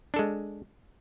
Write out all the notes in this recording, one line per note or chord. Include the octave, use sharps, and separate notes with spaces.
G#3 D4 A4